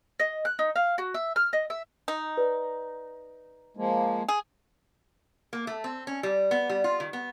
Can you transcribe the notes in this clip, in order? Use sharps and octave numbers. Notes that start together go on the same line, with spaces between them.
D#5
F#6
D#4
F5
F#4
E5
F6
D#5
E5
D#4
B4 D5
F3 G#3 A#3
G#4
A#3
A3
C4
C#4
G3
B3
G3
F4
D#3
B3